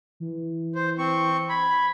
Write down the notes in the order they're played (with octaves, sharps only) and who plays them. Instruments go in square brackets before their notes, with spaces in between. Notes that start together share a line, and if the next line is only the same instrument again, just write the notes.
[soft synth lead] E3
[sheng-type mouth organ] C5
C4 C#6
[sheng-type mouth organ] B5 [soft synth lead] G#6